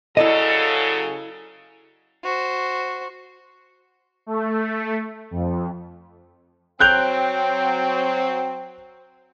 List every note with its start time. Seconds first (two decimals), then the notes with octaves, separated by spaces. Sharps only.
0.17 C#3 F#3 E4 A4 D5 D#5
2.24 F#4 C5
4.26 A3
5.31 F2
6.80 F#3 C4 G5 F#6 G6 F7